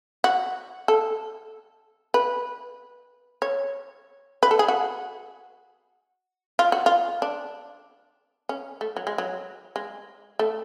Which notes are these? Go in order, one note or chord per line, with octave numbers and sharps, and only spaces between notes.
F#4
A4
B4
C#5
B4
A4
G#4
F#4
F4
F#4
F4
D4
C#4
A3
F#3
G#3
F#3
G#3
A3